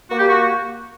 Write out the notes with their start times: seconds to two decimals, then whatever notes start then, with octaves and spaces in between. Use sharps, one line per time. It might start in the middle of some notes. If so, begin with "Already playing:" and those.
0.10 A#3 F#4
0.19 G4
0.28 F#4